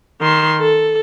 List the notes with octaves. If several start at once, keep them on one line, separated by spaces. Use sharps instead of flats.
D#3 C6
A4